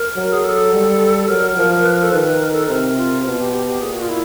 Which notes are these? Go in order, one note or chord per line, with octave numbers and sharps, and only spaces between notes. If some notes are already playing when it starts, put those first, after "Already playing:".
Already playing: A#4
F#3
G#4
A4
G3
F#3 A#4
F3
B4
A#4
A4
D#3 B4
A#4
A4
C3 A#4
F4
B2 F4
G4
G4
G4
A#2 G#4
F#4
F4
E4